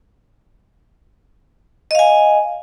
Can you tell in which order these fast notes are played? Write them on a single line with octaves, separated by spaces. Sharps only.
D#5 F5 G#5